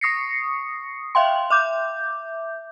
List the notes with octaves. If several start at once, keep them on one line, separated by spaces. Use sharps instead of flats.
C#6 D#6 A#6 C7 C#7
E5 F5 G5 C6
E5 D6 G6